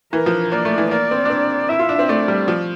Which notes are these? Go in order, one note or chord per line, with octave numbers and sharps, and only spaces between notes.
E3 A#4
F3
A#3 D5
A3
E3
A#3 D5
C4
D4
C4
E4 E5
F4
D4
C4
A3 D5
G3
F3